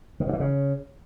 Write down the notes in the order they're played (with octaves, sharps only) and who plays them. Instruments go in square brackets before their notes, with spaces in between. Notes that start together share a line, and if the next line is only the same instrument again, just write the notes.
[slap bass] D#3
C3
E3
C#3